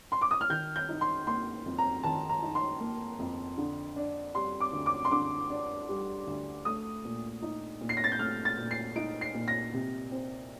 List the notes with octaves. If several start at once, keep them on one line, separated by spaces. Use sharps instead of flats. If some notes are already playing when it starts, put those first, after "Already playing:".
C6
D6
D#6
F6
D#3 G6
G6
D#4
C6
A#3 C6
F2
A#5
D#3 A5
A#5
D#4
C6
A#3
F2
D3
D4
G3 C6
D6
D2
D6
C6
D3 D6
D4
G3
D2
A3 D#6
A#2
D#4
A#2
C7
A#6
A6
G6
A3 F6
A6
A#2
C7
D#4 D7
C7
A#2
A#6
C3
C4